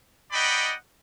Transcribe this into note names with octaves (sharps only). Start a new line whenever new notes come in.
D#4 D5 D#5 F#5 G5 B5